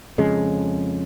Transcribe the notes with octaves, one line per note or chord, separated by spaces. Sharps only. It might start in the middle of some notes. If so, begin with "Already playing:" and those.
F2 C#3 G#3